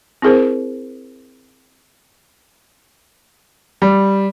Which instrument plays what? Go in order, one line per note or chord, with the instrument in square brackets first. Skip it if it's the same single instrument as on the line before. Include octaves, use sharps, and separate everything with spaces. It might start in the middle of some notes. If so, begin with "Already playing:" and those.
[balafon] C4 E4 G#4 A#4 C5
[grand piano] G3